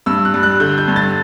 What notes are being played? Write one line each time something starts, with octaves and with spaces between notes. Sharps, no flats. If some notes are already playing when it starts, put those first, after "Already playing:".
G2 E6
F#6
G3
F#6
D3 G6
G6
G2
A6